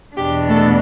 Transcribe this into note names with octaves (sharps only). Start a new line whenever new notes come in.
E2 B2 B3 D4 G4
A3 A4